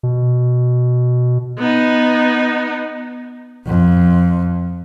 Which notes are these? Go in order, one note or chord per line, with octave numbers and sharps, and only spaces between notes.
B2
B3 D#4
F2